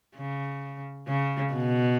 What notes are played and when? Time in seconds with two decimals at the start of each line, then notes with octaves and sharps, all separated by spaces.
0.16 C#3
1.08 C#3
1.53 B2